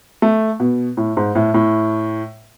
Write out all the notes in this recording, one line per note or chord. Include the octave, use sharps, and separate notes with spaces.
A3
B2
A2
G#2
A2
A2